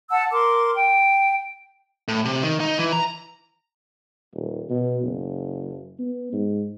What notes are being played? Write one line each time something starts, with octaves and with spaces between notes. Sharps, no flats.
F#5 A5 E6
A#4 C6 D6
G5
A2
C3
D#3
D#4
E3
A#5
D#1
B2
F#1
B3
G#2